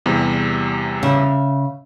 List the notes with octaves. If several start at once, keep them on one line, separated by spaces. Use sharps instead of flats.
E2 C3 G3
C#3 E5